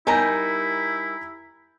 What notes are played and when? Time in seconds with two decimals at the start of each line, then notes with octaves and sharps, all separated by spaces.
0.07 G3 D#4 E4 A#4 G#5 A#5 G6